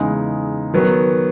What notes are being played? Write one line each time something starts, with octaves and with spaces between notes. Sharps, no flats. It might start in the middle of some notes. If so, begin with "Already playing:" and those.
Already playing: E2 C#3 G#3 D#4
D#3 F#3 B3